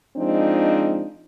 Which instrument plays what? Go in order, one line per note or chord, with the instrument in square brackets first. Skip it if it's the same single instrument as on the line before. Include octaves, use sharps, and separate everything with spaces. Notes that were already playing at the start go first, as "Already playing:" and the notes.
[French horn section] F3 G#3 C4 D4 D#4